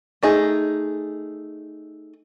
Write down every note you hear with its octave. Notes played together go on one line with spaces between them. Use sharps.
A3 D#4 G#4